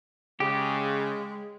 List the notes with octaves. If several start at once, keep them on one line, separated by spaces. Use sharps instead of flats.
C#3 G#3 G4